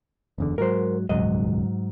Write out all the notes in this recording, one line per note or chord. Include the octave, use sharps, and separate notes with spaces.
F#1 E2 D3
G#2 F#3 A#4 C5
D#1 C#2 G#2 F#3 D#5